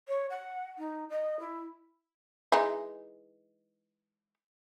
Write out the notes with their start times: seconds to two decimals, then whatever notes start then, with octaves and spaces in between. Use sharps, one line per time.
0.08 C#5
0.30 F#5
0.78 D#4
1.10 D#5
1.40 E4
2.52 E3 G#3 D#4